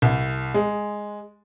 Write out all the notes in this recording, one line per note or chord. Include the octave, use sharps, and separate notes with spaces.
C2
G#3